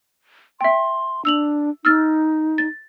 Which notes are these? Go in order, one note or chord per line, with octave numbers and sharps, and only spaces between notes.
E5 G5 C6
D4 E6 F7 F#7
D#4 E6 F6 A6
A6